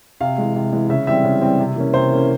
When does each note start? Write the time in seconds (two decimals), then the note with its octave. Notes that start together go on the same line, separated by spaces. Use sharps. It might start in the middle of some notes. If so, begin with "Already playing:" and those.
0.20 C3 F5
0.38 E3 G#3
0.55 C3
0.72 E3 G#3
0.89 C#3 E5
1.07 E3 G3 C4 E5
1.24 C#3
1.42 E3 G3 C4
1.59 C3
1.76 E3 A#3 C#4
1.94 C3 C5
2.11 E3 A#3 C#4